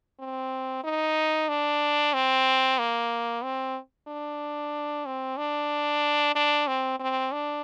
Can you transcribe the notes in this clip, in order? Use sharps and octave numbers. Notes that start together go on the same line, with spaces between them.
C4
D#4
D4
C4
A#3
C4
D4
C4
D4
D4
C4
C4
D4